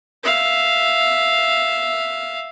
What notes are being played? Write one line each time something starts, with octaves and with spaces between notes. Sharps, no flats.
E5 F5